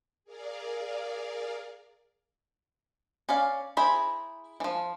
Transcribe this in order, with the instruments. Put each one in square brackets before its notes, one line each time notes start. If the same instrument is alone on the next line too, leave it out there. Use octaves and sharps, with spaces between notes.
[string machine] G#4 A#4 D5 F5
[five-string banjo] C#4 D5 F5
E4 G#4 C5 A#5 B5
E3 F3